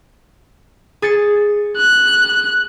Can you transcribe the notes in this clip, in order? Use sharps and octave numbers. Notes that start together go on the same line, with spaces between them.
G#4 A6 C#7
F#6